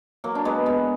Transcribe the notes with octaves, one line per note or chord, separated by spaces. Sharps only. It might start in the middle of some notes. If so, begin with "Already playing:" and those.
F#3 A#3
D4
G#3 B3
G#3 B3